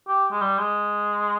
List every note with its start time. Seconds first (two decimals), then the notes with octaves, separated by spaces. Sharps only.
0.08 G4
0.32 G#3
0.42 G3
0.59 G#3